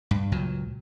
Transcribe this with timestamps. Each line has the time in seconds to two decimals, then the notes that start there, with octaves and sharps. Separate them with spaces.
0.11 G2
0.32 C#2 A#2 F#3